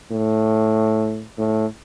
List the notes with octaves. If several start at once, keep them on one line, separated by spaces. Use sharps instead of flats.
A2
A2